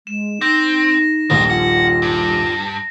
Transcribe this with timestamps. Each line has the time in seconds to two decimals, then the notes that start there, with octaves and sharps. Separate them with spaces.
0.07 G#3 E7
0.41 C4 D#4 A#6
1.30 D#1 A#1 F#3 G#3 A#6
1.50 F4 F#5
2.02 G2